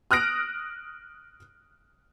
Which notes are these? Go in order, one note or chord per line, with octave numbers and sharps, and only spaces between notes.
D#6 F6 F#6 A#6 D7